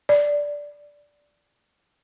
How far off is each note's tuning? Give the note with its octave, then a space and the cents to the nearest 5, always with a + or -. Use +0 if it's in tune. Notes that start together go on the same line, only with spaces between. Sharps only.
D5 -5